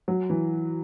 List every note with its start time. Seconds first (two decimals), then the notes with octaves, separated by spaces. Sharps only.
0.08 F#3
0.30 E3